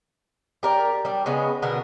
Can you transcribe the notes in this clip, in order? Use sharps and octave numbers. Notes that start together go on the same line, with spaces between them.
G4 A#4 D5
G3 D4
C#3 G#3 B3 C#4
B2 D3 B3 A#4